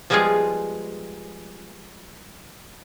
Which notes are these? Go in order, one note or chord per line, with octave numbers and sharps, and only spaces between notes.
F3 G3 G#3 B3 F4 G#4